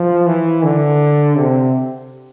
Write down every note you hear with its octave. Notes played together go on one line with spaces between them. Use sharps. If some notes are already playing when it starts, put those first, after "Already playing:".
Already playing: F3
E3
D3
C3